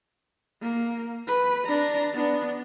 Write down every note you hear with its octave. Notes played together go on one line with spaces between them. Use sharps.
A#3
B4
D4 A#5
B3 D4